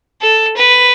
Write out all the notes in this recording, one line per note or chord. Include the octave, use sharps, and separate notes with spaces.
A4
B4